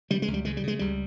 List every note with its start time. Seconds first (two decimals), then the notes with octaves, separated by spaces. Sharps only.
0.11 C#3 G3
0.22 G#3
0.28 C#2
0.34 G3
0.45 C#3 G#3
0.57 G3
0.64 C#3 G#3
0.79 C#2 G3